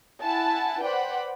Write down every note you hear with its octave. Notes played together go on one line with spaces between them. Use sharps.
E4 F#5 G#5 A5
B4 C5 D5 F#5 G5 B5